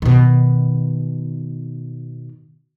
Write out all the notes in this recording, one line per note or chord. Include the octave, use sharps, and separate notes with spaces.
B2 D#3